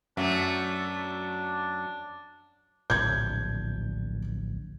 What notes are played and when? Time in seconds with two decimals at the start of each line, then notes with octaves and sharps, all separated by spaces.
0.17 F#2 F#3 A3 D4
2.90 D1 A#1 F3 G6 G#6